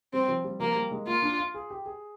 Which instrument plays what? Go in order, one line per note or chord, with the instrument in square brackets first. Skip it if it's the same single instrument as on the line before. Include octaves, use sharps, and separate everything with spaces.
[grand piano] G3 [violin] C4
[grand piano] F3
G3
[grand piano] F3 [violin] A#3
[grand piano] G3
G#3
[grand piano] A#3 [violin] F4
[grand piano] D4
F4
G#4
G4
G#4